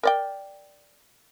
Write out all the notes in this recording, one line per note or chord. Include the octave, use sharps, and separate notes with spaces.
A#4 D5 G5